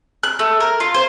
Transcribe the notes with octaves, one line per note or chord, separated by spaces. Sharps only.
F#6
A3
A#4
F4
C5